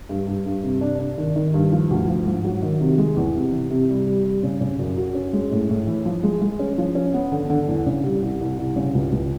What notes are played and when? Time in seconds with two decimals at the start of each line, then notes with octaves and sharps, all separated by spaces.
0.09 G2
0.27 G2
0.46 G2
0.63 C3
0.81 D4
0.99 D4
1.18 D#3
1.36 D#3
1.54 G2
1.72 F3
1.90 D2
2.08 F3
2.26 G#2
2.45 F#3
2.62 D#3
2.81 C3
2.98 G#3
3.17 E2
3.35 C3
3.52 E3
3.70 C3
3.89 G3
4.07 G3
4.25 G3
4.43 C#3
4.61 C#3
4.79 F#2
4.97 F#4
5.15 C#4
5.33 G#3
5.51 A2
5.69 A2
5.87 E3
6.05 F3
6.23 G#3
6.42 G#3
6.59 C#4
6.78 F3
6.95 C#4
7.14 B3
7.32 D3
7.50 D3
7.68 E2
7.86 C#3
8.04 G3
8.22 C2
8.41 C2
8.58 C2
8.76 C#3
8.95 C#2
9.12 C#2